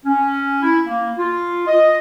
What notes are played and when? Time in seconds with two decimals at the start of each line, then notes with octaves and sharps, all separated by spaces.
0.05 C#4
0.62 E4
0.87 A#3
1.17 F4
1.67 D#5